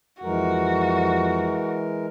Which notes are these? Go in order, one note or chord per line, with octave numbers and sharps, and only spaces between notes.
F2 E3 G#3 F#4 A#4